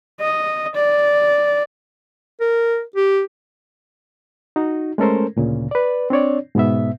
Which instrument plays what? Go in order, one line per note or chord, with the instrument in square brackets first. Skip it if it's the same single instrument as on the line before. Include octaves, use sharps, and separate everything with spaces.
[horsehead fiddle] D#5
D5
[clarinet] A#4
G4
[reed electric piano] D#4 F#4
G#3 A3 C#4 A4 A#4 C5
D2 A#2 C#3
B4 D5
C4 D4 C#5 D5
G#2 B2 B3 E5